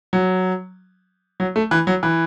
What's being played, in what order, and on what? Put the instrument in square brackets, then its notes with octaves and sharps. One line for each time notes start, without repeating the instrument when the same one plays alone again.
[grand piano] F#3
F#3
A3
E3
F#3
E3